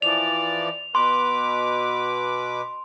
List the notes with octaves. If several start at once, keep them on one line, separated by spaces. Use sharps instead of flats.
E3 F3 D5 F7
B2 B4 C6 D6